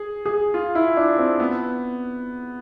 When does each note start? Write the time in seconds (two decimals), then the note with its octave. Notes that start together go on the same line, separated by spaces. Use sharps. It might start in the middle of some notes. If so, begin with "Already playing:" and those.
Already playing: G#4
0.26 G#4
0.54 F4
0.75 E4
0.97 D4
1.18 C4
1.40 B3